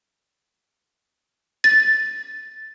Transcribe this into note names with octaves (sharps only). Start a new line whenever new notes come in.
A6